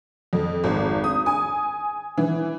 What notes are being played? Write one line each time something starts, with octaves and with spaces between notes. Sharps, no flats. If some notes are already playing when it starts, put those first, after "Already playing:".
F2
G#1
D#6
G#5
E3